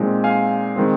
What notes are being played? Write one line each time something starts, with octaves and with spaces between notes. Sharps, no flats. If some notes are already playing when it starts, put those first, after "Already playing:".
Already playing: A#2 G#3 C4 D#4 G#5
F5 G#5
D#3 G#3 C4